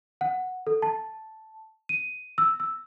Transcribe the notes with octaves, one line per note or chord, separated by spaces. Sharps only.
F#5
A4
A5
D#7
E6
E6